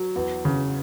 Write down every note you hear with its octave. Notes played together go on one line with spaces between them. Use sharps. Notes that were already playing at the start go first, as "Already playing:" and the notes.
Already playing: F#3
E2
C#3